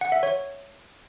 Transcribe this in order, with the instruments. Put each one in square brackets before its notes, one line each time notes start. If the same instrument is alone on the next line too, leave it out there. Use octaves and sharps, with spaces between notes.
[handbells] F#5
E5
C#5